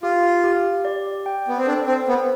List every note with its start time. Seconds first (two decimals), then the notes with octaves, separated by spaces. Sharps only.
0.02 F4 G4
0.44 G4
0.85 D5
1.26 G5
1.48 B3
1.57 C4
1.67 D4 A4
1.87 C4
2.08 B3 C5